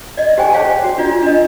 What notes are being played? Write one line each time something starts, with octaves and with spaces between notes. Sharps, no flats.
D5 D#5
G4 C5 G5 G#5 C#6
G#4 C5 C#5 F5 G5 A5
F#4
D4 F4 D5
D4 D#5